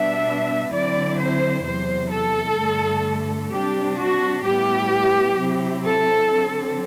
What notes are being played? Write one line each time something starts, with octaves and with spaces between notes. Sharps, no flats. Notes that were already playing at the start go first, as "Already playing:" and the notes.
Already playing: B2 G3 B3 D4 E5
D3 F#3 C4 E4 D5
C5
E2 C3 F#3 C5
A4
G2 D3 A3
C3 G3 D4 G4
F#4
A2 G3 B3 E4 G4
C3 F#3 C4 E4
A4
D3 F#3 C4